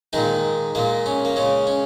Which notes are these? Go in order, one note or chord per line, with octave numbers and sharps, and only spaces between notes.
A#2 D#3 G#3 D#4
A#2 G#3 A#3
C#4
A#3
C#3 G#3 C#4
C#4